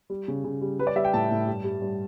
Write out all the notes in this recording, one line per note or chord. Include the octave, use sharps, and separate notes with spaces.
G3
C#3
C#3
G3
G3 B4
D5
G3 E5
G5
A2 A5
A2
G2
G3
G2